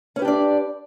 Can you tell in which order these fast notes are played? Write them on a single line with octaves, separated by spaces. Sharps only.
C#4 B4 G4 D4 D5